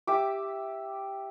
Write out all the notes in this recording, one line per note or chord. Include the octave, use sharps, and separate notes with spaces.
G4 E5 D6